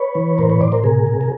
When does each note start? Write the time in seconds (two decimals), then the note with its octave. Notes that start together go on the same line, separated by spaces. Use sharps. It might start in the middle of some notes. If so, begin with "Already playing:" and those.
Already playing: B4 C#5
0.15 E3
0.38 A2 A#4 C5
0.49 B4 C#5
0.60 A2 C5 D5
0.72 A#4 C5
0.84 C3 G#4 A#4
1.07 C3
1.21 A#4